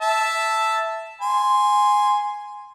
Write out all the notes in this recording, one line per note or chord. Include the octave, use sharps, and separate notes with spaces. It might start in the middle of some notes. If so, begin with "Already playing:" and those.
E5 A5
G#5 C6